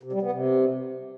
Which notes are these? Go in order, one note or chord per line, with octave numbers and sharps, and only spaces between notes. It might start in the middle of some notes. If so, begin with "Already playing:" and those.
C3
G3
B3
C3